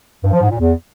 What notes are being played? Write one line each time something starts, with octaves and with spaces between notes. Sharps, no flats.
G2
F3
G#2
A#2
E2